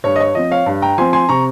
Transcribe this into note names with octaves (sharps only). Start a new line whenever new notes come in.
G2 C#5
D#5
C#5
F3 C4 D#5
C#5 F5
G2
G5 A#5
F3 C4 G#5 C6
G#5 C6
C3 A#5 C#6